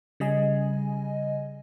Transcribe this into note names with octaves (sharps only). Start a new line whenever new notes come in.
C#3 G3 D#5 G#5